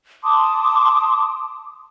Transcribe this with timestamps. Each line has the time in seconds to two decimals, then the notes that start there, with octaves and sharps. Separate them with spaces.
0.23 A5 C6 D6 D#6